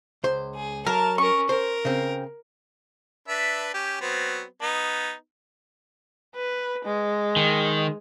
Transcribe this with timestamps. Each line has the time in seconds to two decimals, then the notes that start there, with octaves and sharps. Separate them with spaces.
0.24 C#2 C5
0.55 G#4
0.87 F#3 A#4 A5
1.18 C#4 A#4 C#6
1.49 A#4 C5
1.85 C#3 C4
3.28 D4 B4 E5
3.74 C#4 G4
4.01 F#3 B3 C4
4.62 B3 D#4
6.35 B4
6.85 G#3
7.36 D#3